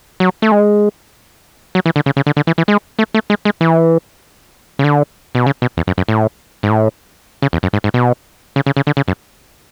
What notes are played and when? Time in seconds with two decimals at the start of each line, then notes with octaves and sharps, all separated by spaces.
0.20 F#3
0.42 A3
0.52 G#3
1.75 F#3
1.86 E3
1.96 D3
2.06 C#3
2.17 C#3
2.27 D3
2.37 D3
2.47 E3
2.58 E3
2.68 G#3
2.99 A3
3.14 A3
3.30 G#3
3.45 G#3
3.61 E3
4.79 C#3
4.84 D3
5.35 B2
5.46 C#3
5.62 B2
5.77 E2
5.87 F#2
5.98 F#2
6.09 A2
6.63 G#2
6.70 A2
7.42 C#3
7.53 E2
7.63 F#2
7.73 G#2
7.84 G#2
7.94 B2
8.56 C#3
8.66 C#3
8.77 C#3
8.87 D3
8.97 C#3
9.08 F#2